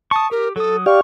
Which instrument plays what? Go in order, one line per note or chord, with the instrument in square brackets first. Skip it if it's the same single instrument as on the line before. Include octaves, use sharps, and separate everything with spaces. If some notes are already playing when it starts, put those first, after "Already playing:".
[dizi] A5 [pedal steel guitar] C#6 D#6
[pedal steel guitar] G4 [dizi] A#4
[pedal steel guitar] F#3 D#6 [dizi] A4
[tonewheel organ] G4 D5 F5 [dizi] C#6